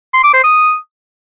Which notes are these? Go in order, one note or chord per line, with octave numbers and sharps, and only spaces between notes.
C6
D6
C5
D#6